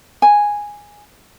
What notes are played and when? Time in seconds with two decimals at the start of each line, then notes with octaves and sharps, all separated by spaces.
0.22 G#5